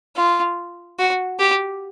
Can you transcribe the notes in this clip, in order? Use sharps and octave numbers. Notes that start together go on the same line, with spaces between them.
F4
F#4
G4